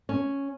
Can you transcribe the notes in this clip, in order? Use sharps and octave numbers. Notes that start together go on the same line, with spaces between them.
C#4